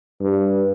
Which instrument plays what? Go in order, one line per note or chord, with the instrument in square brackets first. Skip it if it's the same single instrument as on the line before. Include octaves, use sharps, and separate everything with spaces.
[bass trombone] G2